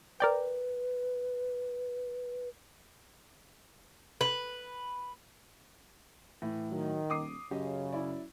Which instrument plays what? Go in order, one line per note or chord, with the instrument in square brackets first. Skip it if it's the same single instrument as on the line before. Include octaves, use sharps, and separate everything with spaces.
[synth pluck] A#4 D5 G5 [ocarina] B4
[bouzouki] B4
[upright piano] A2 [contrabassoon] E3
[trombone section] D#3 [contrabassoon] F#3
[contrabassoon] D#1 [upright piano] D6 D#6 C7
[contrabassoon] F#2 [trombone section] C#3 [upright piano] G4 D#5
[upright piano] E4 D5